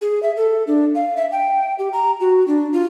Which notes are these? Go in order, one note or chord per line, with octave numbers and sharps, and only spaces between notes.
G#4
E5
A4
D4
F5
E5
G5
G4
A#5
F#4
D4
F4